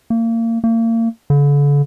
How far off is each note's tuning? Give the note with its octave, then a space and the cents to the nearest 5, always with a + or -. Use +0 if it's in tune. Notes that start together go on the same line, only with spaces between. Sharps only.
A#3 -30
A#3 -35
D3 -40